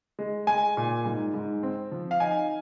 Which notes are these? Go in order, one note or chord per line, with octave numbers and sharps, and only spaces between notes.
G#3
G#3 G#5
A#2
G#2
G#2
C4
F3
F5
D#4 G#5